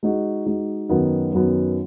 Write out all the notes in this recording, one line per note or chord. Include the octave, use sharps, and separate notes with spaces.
G#3 D#4 F#4
G#3 D#4 F#4
F#2 D#3 F#3 B3
F#2 D#3 F#3 B3